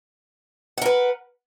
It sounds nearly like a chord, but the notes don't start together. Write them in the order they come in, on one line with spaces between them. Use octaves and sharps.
F#5 A#4 B4